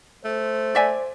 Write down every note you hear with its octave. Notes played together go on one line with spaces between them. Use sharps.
A3 C5
D5 E5 G#5